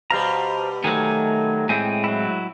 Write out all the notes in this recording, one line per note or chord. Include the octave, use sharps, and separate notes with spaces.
B2 G3 C5 F5 A#5
D#3 F#3 A3 G#5
A2 G#3 C4 G#5
F#3 E4